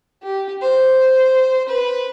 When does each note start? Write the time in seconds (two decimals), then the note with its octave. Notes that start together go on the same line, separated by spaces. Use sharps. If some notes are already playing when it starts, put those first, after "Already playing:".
0.23 G4
0.62 C5
1.69 B4